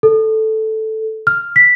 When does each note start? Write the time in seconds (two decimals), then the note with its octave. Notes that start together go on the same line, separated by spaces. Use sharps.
0.03 A4
1.27 F6
1.56 B6